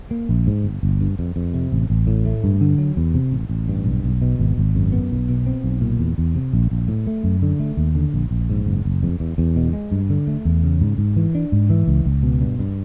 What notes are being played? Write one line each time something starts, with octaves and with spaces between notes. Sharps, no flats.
A#3
A#1
G#2
G1
G1
G2
F2
F2
C3
A1
A1
A2
A3
G2
D3
F#3
E2
C3
A1
A1
G2
B1
B1
B2
G#1
G#1
F#2
B3
B1
B2
C4
B1
A#2
E2
E2
C3
A#1
A#1
A2
A3
F#2
D3
A3
D#2
D3
A#1
A#1
G#2
F#1
F#1
F2
E2
E2
B2
G#3
G2
D3
A3
E2
C#3
G#2
G#2
E3
D4
G#2
E3
C#2
C#2
B2
G2
G2